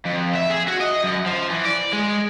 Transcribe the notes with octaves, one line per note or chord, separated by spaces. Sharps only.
F2
E5
G#4
F#4
D#5
F#2
F3
E3
D5
G#3